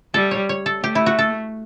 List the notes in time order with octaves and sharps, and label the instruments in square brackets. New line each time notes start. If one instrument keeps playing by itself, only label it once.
[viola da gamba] G3 [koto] A4
[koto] C#5
C#5
A4
[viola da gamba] A3 [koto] G4
[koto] E4
F#4
A4